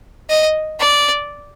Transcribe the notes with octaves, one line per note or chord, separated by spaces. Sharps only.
D#5
D5